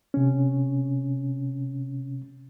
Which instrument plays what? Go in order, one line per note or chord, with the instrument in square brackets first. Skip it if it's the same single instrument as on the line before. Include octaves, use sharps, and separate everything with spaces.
[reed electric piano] C3 C#4